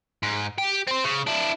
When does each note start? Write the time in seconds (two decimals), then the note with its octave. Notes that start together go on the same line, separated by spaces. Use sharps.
0.23 G#2
0.58 G4
0.88 C4 C5
1.05 C#3
1.27 D4 E4